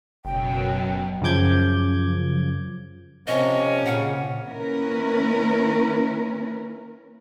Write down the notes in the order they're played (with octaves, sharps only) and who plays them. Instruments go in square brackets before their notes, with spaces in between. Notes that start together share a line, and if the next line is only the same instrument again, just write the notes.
[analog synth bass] F#1 [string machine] F#2 B2 F#3 [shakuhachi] G5
[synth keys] F#2 C#3 F3 D6 G6 G#6
[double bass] C3 [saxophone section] F3 A#3 C#4 [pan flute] D#5
[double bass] A#2 C#3 [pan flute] F#5
[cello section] D#3 A#3 C#4 E4 A#4 B4